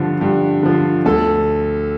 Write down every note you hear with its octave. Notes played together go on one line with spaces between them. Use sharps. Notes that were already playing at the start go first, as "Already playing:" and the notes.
Already playing: G2 D3 F3
G2
D3 F3
D2 A4